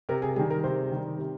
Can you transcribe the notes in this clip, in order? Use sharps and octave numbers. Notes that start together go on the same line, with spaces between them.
C3 A#4
G#4
D#3 G3 G#4
A#4
C3 C5
D#3 G3
C3